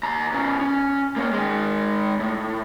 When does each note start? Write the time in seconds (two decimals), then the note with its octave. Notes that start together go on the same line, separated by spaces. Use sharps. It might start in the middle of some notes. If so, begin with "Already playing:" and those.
0.03 D#2 A#5
0.32 B2 C#4
0.61 C#4
1.16 A#3 C#4
1.33 D#3 G#3
2.20 A2